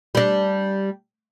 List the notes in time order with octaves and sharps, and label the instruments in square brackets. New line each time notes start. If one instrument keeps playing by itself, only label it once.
[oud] G3 D4